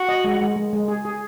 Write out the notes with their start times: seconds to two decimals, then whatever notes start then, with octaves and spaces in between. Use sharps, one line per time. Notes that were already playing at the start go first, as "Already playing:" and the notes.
Already playing: F#4
0.09 D#5
0.24 G#3
0.41 G#3
0.56 G#3
0.73 G#3
0.88 G#4
1.05 G#4